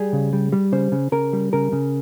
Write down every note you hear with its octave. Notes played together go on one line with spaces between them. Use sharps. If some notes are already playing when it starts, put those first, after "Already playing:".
Already playing: G3 G#4
C#3
G3
G3
C#3 C5
C#3
C#3 A#4
G3
C#3 A#4
C#3